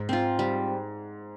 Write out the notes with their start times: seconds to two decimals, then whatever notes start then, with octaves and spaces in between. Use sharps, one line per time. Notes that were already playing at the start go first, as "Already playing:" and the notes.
Already playing: G#2
0.09 C4 F4
0.39 G3